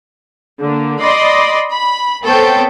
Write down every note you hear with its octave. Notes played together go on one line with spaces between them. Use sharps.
D3 A#3
D5 D#5 B5 C6
B5
B3 C4 A4 C5 C#5 G5